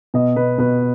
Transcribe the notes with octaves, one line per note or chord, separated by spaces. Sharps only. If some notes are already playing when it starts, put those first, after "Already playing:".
B2 D#5
B2 B4
B2 B4